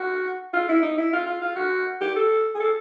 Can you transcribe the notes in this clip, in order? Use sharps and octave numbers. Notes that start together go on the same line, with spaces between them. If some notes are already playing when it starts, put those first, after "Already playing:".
Already playing: F#4
F4
E4
D#4
E4
F4
F4
F4
F#4
G4
A4
G#4
A4